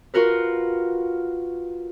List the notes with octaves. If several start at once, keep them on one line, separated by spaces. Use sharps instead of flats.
F4 F#4 A#4 B4